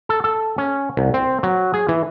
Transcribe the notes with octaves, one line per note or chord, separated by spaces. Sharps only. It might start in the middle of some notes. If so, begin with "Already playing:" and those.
A4
A4
C#4
C2
C4
F#3
G#4
E3